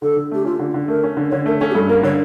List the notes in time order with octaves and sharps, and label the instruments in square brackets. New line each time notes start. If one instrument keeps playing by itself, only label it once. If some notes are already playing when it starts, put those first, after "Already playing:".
[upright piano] D3 [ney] A4
[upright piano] D3
[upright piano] A3 [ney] G4
[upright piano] C#4 [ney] F4
[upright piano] D3
D3
[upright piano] A3 [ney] A#4
[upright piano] C#4
D3
[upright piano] D3 [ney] C#5
[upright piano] A3 [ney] A#4
[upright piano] C#4 [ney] A4
[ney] G4
[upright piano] G2 [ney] A4
[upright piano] A#3 [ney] A#4
[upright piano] D3 [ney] C#5